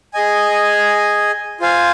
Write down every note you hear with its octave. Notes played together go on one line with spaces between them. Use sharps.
G#4 D#5 G#5
F4 C5 F5 G#5